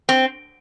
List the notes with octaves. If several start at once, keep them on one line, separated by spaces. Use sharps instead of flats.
C4